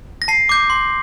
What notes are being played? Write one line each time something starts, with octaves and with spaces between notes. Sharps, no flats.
A#6
A5 C7
D6 G6
C6